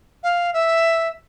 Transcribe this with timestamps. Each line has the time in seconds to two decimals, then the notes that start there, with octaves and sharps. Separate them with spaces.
0.23 F5
0.53 E5